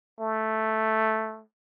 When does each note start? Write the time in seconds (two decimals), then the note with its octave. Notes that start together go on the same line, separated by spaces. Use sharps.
0.20 A3